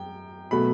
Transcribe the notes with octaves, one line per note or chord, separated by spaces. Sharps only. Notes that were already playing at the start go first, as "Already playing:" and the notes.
Already playing: F#2 G5
B2 F#3 A3 B5